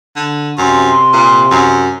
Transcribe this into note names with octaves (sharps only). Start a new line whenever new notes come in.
D3
F#2 C3 C6
A#2
F#2